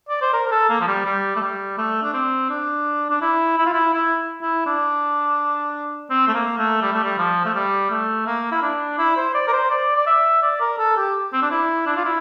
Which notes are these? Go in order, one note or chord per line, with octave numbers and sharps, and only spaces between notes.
D5
C5
A#4
A#4
A4
A#3
F3
G3
G3
A3
G3
A3
D4
C4
D4
D4
E4
E4
F4
E4
E4
E4
D4
C4
A3
A#3
A3
G3
A3
G3
F3
A3
G3
A3
A#3
E4
D4
E4
C5
D5
A#4
C5
D5
D5
E5
D5
A#4
A4
G4
C4
D4
E4
D4
F4
E4